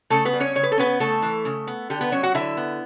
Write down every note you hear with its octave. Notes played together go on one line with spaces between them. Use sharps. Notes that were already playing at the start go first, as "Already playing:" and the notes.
C#3 A3 A4
B3 B4
G3
C#4 C#5
C#3 C#5
B4
A4
B3 C#4 B4
C#3 A3 A4
E3
C#3
B3
D3 G4
B3 B4
F#3 C#4 C#5
F#4 F#5
D3 E4 E5
B3